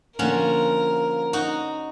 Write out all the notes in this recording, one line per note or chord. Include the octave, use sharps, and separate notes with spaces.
D3 F3 A#3 C#4 F#4 A#4
D#4 F#4